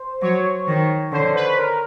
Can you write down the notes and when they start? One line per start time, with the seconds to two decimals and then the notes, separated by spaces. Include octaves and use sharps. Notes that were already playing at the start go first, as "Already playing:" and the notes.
Already playing: C5
0.22 F#3 C#5
0.68 D#3
1.12 D3 C5
1.35 B4
1.58 A#4